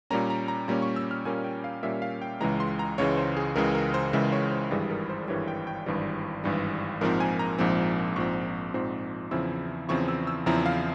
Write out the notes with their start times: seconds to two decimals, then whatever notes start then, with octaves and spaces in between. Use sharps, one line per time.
0.10 A#2 G3 A#3 C#4 A#5
0.30 A#5
0.48 A#5
0.68 A#2 G3 A#3 C#4 A#5
0.82 C#6
0.96 E6
1.11 F6
1.25 A#2 G3 A#3 C#4 G#5
1.44 G5
1.64 F5
1.83 A#2 G3 A#3 C#4 E5
2.02 F5
2.22 G5
2.40 C#2 C#3 E3 G#3 A#5
2.60 C6
2.79 A#5
2.98 C#2 C#3 E3 G#3 C#5
3.17 C5
3.37 G#4
3.56 C#2 C#3 E3 G#3 A#4
3.75 A#4
3.94 C5
4.13 C#2 C#3 E3 G#3 E5
4.32 C#5
4.52 C5
4.71 G#1 G2 E3 G3 G#4
4.90 A#4
5.09 C5
5.28 G#1 G2 E3 G3 C#5
5.48 G5
5.67 G5
5.86 G#1 G2 E3 G3
6.44 G#1 G2 E3 G3
7.01 A#1 G#2 F3 C4 A#4
7.20 G#5
7.39 A#5
7.58 A#1 G#2 F3 C4
8.16 A#1 G#2 F3 C4 C#6
8.74 A#1 G#2 F3 C4
9.31 E2 C#3 F3 C4 E4 E6
9.89 E2 C#3 F3 C4 E4 C#6
10.08 E6
10.27 E6
10.46 E2 C#3 F3 C4 E4 A#5
10.66 F5